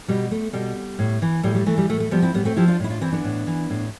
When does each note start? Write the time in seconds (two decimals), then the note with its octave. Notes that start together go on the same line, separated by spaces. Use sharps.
0.08 B2 G3
0.31 A3
0.53 B2 G3
0.99 A2
1.22 E3
1.43 A2 G3
1.55 G3
1.66 E3 A3
1.78 G3
1.89 A2 A3
2.00 A3
2.11 F3 G3 B3
2.22 C4 E4
2.34 A2 G3 B3
2.45 A3 C4
2.56 F3 E4 G4
2.68 D4 F4
2.80 A2 E4
2.90 D4 F4
3.01 E3 C4 E4
3.12 B3 D4
3.24 A2
3.47 E3
3.70 A2